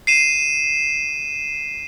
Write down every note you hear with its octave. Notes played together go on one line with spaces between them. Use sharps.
C7 D#7 E7